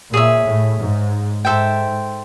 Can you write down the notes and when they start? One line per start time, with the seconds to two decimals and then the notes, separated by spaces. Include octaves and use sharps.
0.13 A#2 G#4 C#5 E5
0.46 A2
0.79 G#2
1.45 G#2 A4 C5 E5 G5